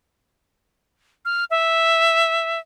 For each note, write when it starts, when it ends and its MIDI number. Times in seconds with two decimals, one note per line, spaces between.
1.25 1.44 89
1.51 2.59 76